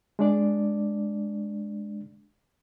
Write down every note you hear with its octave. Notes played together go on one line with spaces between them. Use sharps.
G#3 D4 D5